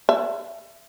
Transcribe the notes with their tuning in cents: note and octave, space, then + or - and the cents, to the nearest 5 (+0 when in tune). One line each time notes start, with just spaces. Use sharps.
E5 +35